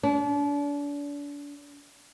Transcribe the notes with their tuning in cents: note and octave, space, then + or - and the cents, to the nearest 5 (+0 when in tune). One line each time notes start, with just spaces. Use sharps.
D4 -35